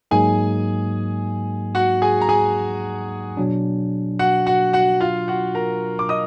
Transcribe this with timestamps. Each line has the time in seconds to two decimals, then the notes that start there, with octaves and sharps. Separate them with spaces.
0.11 G#2 F#3 A#3 D#4 G#4 G#5
1.75 F#4 F#5
2.02 G#4 G#5
2.21 A#5
2.29 G#4 G#5
3.37 B2 F#3 D4
4.19 F#4 F#5
4.46 F#4 F#5
4.73 F#4 F#5
5.01 F4 F5
5.28 F#4 F#5
5.55 A#4 A#5
5.99 D6
6.09 D#5 D#6